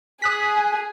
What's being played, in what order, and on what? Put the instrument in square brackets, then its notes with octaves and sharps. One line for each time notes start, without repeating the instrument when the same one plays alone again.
[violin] G#4 [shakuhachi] G#5 [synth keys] D#6 F#6 B6